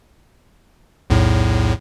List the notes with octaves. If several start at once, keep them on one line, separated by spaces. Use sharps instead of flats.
B1 E2 A2